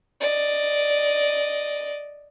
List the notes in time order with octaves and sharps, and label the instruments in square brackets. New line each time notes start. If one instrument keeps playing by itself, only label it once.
[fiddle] D5 D#5